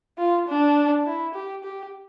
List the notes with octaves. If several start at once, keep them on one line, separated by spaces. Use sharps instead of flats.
F4
D4
E4
G4
G4